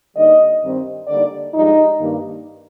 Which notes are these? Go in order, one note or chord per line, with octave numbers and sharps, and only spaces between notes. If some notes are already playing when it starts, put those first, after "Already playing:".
D3 G3 A#3 D#4 D#5
G2 D#3 G3 C4
D3 G3 A#3 D#4 D5
G2 F3 G#3 D#4
G2 D#3 A#3